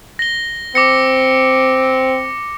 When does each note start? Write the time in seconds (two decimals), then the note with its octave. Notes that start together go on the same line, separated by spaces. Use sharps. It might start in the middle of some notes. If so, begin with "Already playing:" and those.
0.19 A#6 G7
0.75 C4 D6 A#6 C#7